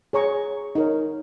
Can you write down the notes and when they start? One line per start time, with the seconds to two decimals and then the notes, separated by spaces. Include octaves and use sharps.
0.13 G#4 C#5 A#5 C#6
0.75 D#4 A#4 C#5